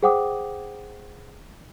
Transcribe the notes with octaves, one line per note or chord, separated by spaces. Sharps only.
G#4 C5 F#5 G5 D6 D#6